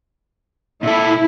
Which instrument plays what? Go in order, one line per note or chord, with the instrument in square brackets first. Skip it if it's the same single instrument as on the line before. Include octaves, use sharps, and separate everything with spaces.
[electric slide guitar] A#2 A4 [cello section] E4